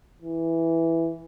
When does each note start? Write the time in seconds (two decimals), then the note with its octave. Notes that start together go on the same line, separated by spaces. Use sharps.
0.22 E3